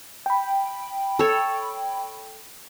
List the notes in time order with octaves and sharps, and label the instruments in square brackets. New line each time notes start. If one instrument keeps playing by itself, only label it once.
[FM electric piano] G5 B5
[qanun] A4 C#5